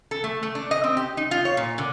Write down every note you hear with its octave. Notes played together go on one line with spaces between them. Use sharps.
A4
A3
A3
D4
D#5
C4
G4
D#4
F4
C#5
A#2
D3